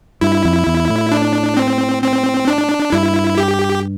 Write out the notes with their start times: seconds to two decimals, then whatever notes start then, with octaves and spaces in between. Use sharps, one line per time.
0.21 G2 E4
0.45 F2
0.67 E2
0.89 A2
1.12 D4
1.57 C4
2.02 C4
2.48 D4
2.92 G2 E4
3.38 G4